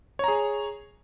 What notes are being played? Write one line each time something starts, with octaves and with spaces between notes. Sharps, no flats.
G#4 C#5 A#5